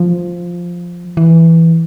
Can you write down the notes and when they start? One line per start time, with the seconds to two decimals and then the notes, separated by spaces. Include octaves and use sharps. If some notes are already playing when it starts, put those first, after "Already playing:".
Already playing: F3
1.17 E3